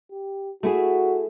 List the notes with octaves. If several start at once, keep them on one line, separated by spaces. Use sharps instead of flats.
G4
A3 E4 F#4 G#4